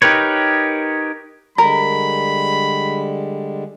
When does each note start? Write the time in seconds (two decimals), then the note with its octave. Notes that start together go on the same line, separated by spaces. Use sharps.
0.02 D#4 G4 A#4 B4 C#5
1.58 D3 G3 G#3 A#4 B5